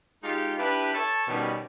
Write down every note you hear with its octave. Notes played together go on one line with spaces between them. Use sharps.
G#3 D#4 F4 G4
D4 E4 G4 B4
A4 C#5 A5
B2 D#3 G3 C#4 F#4